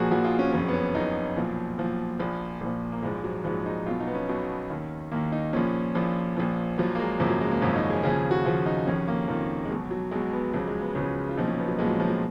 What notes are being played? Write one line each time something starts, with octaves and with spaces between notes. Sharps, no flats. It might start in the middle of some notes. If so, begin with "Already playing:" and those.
Already playing: A#1 A#2 F3 F#4 G#4 A#4
A#1 A#2 F3 F#4
F4
C#4
F#1 F2 F3 C#4
B3
C#4
F#1 F2 F3 D#4
B1 A#2 F3
B1 A#2 F3
A#1 A#2 F3
A#1 A#2 F3
A#3
A#1 G#2 F3 G#3
G#3
F#3
A#1 G#2 F3
D#4
B1 B2 F4
D#4
B3
C#4
B1 B2
D#2 D#3
D#2 D#3 A#3
D#4
A#1 A#2 F3 C#4
A#1 A#2 F3
A#1 A#2 F3
A#1 A#2 F3 F#3
A#3
G#3
G#1 F#2 C#3 F3 A#3
F#3
G#3
A#3
G#1 F#2 C#3 F3 C#4
D#4
G#4
D#2 C#3 F3 G#4
F#4
D#2 C#3 F3 F4
D#4
F1 F2 D#3 C#4
A#3
F1 F2 D#3 F3
G#3
B1 B2 F#3
F#3
B1 B2 G#3
B3
C#2 C#3 F3 F#3
G#3
B3
C#2 C#3 F3 C#4
F4
B1 A#2 F3 D#4
C#4
B3
F#3
B1 A#2 F3 G#3
F#3
F3
F#3